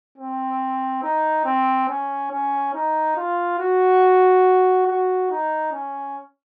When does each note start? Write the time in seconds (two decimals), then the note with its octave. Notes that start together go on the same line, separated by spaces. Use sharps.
0.18 C4
1.03 D#4
1.45 C4
1.89 C#4
2.32 C#4
2.74 D#4
3.16 F4
3.59 F#4
4.87 F#4
5.31 D#4
5.73 C#4